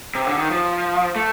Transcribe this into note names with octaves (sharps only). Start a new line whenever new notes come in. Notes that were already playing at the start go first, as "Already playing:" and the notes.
C3
D3
D#3
F3
A3